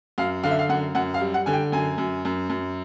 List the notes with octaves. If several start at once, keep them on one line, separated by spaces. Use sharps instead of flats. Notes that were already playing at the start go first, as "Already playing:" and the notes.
F#2 F5
D3 F5
E5
F5
F#2 F#5
F#2 F#5
F5
G3
F#5
D3 G#5
G5
F#2 G#5
F#2
F#2
F#2